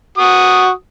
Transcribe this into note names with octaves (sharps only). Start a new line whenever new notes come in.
F#4 D#6